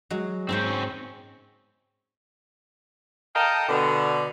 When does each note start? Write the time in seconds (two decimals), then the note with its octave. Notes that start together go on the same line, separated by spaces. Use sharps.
0.10 F#3 G#3
0.49 G#2 C4 C#4 C5 G5
3.36 A4 D#5 F5 G5 A5 A#5
3.69 B2 D3